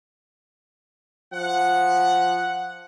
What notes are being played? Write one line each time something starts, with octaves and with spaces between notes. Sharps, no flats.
F3 F#5